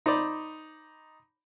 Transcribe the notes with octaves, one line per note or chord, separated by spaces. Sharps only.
D#4 C5 D5 B5